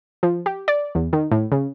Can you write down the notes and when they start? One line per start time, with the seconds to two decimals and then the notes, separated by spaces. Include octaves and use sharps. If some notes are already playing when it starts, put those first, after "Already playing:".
0.23 F3
0.46 G4
0.68 D5
0.95 E2
1.13 D#3
1.31 A2
1.52 C#3